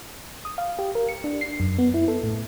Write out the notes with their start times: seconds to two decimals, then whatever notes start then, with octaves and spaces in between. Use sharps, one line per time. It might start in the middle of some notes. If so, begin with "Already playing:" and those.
0.45 D#6
0.58 F5
0.79 G4
0.95 A#4
1.09 C#7
1.24 D4
1.41 C7
1.60 F#2
1.79 B3
1.94 E4
2.08 A4
2.24 A2